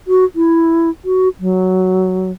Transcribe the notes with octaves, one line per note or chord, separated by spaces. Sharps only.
F#4
E4
F#4
F#3